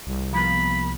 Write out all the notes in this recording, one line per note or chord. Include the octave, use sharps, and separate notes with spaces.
C2
F3 A#3 B3 B5